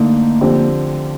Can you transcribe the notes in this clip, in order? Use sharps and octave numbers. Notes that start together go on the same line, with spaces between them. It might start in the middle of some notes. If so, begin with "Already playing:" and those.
Already playing: D3 A3 A#3 D#4
D3 F3 C4 G4